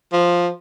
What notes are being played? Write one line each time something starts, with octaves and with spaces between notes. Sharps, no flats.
F3